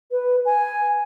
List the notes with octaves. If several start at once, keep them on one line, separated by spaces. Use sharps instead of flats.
B4
G#5